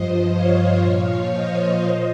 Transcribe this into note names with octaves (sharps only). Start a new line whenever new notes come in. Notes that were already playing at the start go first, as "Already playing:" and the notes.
Already playing: G2 F3 C5 D#5
C#5 F5
A#2 F3
C5 D#5
A#2 C5 D#5